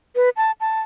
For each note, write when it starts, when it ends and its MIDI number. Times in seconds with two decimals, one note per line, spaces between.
0.16 0.30 71
0.37 0.51 81
0.61 0.81 81